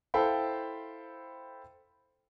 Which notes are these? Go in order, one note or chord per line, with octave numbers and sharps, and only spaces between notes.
E4 A4 C5 F5 G5 B5